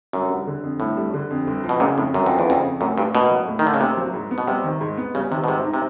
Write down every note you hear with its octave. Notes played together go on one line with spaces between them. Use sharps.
G1 F#2
G3
D3
F2
G1 A2
G3
D3
F2
G1
F3
B2
A#2 C#3
F2 A2
G1 F#2
F2 F3
E2
F2 C#3
F2
F#2 A2
G2 D4
B2 A#3
F#3
A2
D#3
D3 D4
C#3
C3 A#3
F#3
G#2
B3
B2
C3 G3
D#3
G#2
B3
C#3 G3
C3 D#3
B2
G#2 C3
D#4
C3